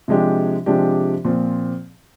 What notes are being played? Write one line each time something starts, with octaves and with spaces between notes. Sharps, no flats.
C3 F3 G#3 D4 G4
C3 F3 G#3 D4 G4
A#2 F3 C4